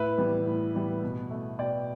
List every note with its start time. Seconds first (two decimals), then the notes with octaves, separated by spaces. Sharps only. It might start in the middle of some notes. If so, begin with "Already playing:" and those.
Already playing: A2 B4 E5
0.18 E3 G3 B3
0.46 A2
0.75 E3 G3 B3
1.03 B2
1.30 A3
1.59 B2 D5 G5